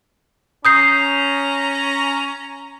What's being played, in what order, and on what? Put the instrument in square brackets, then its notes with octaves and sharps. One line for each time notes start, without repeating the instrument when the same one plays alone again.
[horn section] C#4 A#5 [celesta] D#6 G6 C7